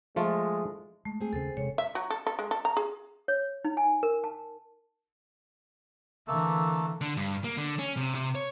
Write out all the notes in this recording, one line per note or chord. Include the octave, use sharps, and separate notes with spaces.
F3 G#3 A3 F4
G#3 A3
C4 G#4
D#2 C#3 C#4 A4 C5
E1 C3 G#3 C#5
E5
F#3
A4
A4
G#3
A4
A#5
G#4
C#5
D#4
G#5
A#4
A5
D3 E3 A3 A#3 A4
D3
G2
A#3
D3
C#4
C3
C3
C#5